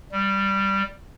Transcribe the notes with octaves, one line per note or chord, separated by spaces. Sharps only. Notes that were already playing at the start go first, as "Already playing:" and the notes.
G3